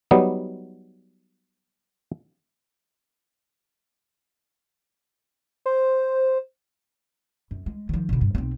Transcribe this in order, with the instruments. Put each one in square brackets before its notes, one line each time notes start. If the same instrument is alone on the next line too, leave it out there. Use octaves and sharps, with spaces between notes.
[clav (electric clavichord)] F#3 G3 B3 D#4
[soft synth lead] C5
[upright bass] F#2
G#3
D#3 F3
B2 D3
G2
B1 C4